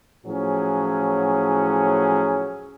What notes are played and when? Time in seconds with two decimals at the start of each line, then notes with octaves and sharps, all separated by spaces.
0.27 A2 F3 F#3 C#4 G#4